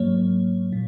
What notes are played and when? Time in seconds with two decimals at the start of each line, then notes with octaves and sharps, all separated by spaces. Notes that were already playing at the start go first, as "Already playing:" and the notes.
Already playing: G#2 F#3 A#3 C#5
0.72 A#2